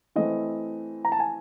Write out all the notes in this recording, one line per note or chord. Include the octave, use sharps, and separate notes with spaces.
E3 A3 C4 D#5
A#5
A5
G#5